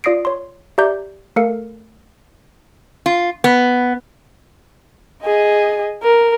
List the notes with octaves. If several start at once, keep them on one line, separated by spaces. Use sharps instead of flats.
F4 D5 D#6 A#6 C7 D7
C#5 C6
G4 D5 E5 A#5 D6 G6
A3 A4 A#4 F5 C#7
F4
B3
G#4 D#5
A#4